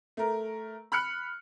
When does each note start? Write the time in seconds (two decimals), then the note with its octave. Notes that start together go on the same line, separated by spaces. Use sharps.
0.17 A3 A#4
0.92 B5 F6 F#6 C#7